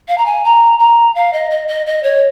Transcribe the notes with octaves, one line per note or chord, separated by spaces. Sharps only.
F5
A#5
G#5
A#5
A#5
F5
D#5
D#5
D#5
D#5
C#5